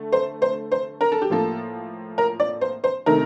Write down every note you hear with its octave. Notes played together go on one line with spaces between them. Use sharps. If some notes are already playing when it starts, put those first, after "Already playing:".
Already playing: D3 A3
C5
C5
C5
A#4
A4
G4
A2 F3 A#3 A4
A#4
D5
C5
C5
C3 D#3 A3 A#4